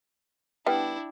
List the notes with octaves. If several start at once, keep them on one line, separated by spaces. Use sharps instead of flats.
G3 B3 D4 E4 G5